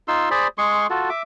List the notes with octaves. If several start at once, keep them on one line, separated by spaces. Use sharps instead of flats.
D#4 F4 C6 E6
G#4 C5 D5 B5
G#3 G#4 C6 C#6
F4 F#4 A4
E5 D6